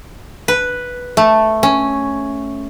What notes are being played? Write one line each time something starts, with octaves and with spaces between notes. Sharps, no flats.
B4
A3
C#4